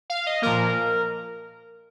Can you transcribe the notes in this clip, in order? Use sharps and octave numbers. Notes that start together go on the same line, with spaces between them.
F5
D#5
A#2 F3 A#3 A#4